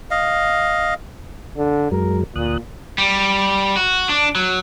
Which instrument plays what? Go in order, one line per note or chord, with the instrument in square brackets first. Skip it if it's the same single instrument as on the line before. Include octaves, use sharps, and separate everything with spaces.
[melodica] D#5 F5
[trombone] D3
[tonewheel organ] F#2 F#3 G#3 [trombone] A#4
[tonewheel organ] D2 D#6 F#6 [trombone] A#2
[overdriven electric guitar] G3
F#4
D4
F#3